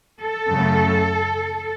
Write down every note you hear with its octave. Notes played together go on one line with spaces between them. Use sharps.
A4
F#2 C#3 F#3 A3